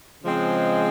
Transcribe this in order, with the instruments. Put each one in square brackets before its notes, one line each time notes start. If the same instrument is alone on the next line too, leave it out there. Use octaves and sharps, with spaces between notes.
[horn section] C#3 F3 G#3 C4